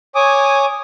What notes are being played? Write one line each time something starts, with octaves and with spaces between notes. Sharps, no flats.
C#5 G#5 D6 D#6